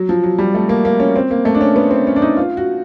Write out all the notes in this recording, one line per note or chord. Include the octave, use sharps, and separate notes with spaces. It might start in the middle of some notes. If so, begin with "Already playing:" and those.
Already playing: F#3
F3
F#3
G3
A3
A#3
A#3
C#4
C4
A#3
A3
D4
C#4
B3
C4
C#4
D4
D#4
F4
F#4